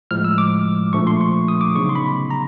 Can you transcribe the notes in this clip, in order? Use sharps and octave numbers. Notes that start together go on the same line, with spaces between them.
A2 F3 G#3 F6
E6
D6
A#2 F3 A3 D4 C#6
C6
C#6
D#6
D6
C#3 F#3 B3 D#4 C#6
C6
B5
A#5